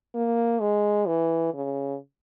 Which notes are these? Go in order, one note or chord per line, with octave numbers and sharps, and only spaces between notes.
A#3
G#3
E3
C#3